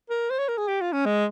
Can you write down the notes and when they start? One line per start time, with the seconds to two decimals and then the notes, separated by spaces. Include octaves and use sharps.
0.10 A#4
0.30 C5
0.39 C#5
0.48 A#4
0.58 G#4
0.68 G4
0.81 F4
0.93 C#4
1.06 G#3